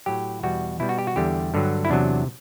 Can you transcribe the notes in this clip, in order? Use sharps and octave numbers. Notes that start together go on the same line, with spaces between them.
A2 F#3 G4
E2 B2 G3 F#4
B2 G3 E4
F#4
G4
F#4
E2 D3 G3 G4
G2 D3 F#3
E4
E2 C3 F#3 D4